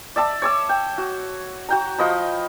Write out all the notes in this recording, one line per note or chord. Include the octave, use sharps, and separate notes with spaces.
D5 E5 A5 E6
C#5 D6 E6
G5
F#4
F#4 G5 A#5
F3 D#5 B5